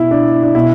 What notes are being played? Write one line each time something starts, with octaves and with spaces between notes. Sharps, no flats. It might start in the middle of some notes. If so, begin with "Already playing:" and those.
Already playing: B2 E4
D4
D4
B2 E4